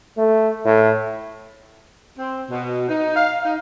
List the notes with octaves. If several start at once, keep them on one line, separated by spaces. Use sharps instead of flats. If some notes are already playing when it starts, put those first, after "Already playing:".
A3
A2
C4
B2
D#4
F5
D#4